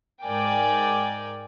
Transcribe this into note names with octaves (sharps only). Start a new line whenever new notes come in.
G#2 A#4 D5 G5 G#5